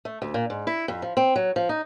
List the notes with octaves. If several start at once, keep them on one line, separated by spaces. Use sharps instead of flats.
A3
D2
A#2
G#2
E4
F2
F3
C4
F#3
F3
D#4